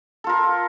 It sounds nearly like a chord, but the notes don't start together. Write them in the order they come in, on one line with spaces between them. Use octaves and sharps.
A4 F4 A#4